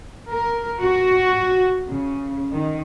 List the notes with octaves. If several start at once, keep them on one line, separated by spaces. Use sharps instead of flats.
A#4
F#4
C#3
D#3